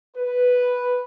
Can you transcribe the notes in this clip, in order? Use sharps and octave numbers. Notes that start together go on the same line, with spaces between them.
B4